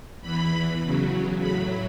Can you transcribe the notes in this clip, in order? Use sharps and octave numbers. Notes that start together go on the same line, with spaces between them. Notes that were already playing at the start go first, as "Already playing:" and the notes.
E2 E3 B5
E2 C#3 F#3
A2 F#3 B5